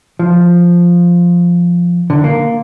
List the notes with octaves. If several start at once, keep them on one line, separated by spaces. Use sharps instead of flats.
F3
D3
A#3